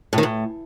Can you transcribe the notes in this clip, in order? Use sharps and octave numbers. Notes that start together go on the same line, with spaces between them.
A2
D#3
A2